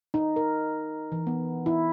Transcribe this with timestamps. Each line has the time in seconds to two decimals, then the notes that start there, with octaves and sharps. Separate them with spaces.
0.14 D#4
0.36 A#4
1.12 E3
1.27 B3
1.66 E4